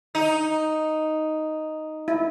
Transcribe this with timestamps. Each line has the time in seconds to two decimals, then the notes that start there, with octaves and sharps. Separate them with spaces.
0.15 D#4
2.08 E4